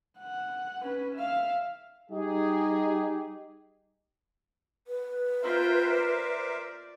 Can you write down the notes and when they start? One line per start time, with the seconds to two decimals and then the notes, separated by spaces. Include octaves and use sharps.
0.18 F#5
0.83 C#4 B4
1.16 E5 F5
2.10 G3 D#4 G4 G#4
4.87 B4
5.42 F4 A#4 C5 E5 G5
5.92 D5